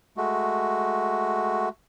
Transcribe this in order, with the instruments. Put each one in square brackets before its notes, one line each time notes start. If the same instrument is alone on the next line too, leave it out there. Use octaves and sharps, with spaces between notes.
[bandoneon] G#3 A3 F#4